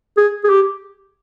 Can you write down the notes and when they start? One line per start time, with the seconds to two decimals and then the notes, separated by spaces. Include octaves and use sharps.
0.17 G#4
0.44 G#4
0.50 G4